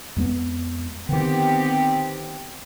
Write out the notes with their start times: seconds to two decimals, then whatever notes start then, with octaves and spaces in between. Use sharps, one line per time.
0.16 F2 G#3 B3
1.09 D3 D#3 B3 C4 G4